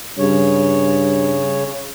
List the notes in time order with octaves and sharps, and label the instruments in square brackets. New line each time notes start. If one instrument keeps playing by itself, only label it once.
[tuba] G2 [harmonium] C#3 C#5